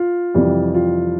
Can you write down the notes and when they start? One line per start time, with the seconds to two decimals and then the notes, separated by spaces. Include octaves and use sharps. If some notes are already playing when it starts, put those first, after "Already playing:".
Already playing: F4
0.35 F2 C3 E3 G3
0.74 F4